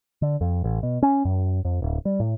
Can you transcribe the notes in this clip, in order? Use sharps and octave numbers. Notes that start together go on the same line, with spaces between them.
D3
F2
A1
B2
C#4
F#2
F2
D1
G3
A2